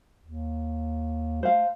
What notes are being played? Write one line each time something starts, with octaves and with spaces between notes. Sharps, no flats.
D#2
A3 C5 F5